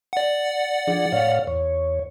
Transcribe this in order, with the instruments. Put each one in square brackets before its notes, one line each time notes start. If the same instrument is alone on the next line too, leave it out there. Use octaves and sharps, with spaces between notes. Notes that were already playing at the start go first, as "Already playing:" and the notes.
[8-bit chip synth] D5 F#5
[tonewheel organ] F3 D4 G#4
A2 C#5 F5
E2 C#5